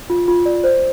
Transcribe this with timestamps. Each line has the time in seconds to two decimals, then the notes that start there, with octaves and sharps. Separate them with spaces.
0.10 F4
0.28 F4
0.46 D5
0.64 C5